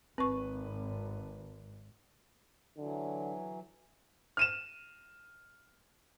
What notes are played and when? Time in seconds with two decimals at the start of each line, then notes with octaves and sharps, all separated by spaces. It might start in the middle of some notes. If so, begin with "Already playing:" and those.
0.18 G#1 C4 B4 C#6
2.77 D3 E3 F#3
4.37 F6 D#7 E7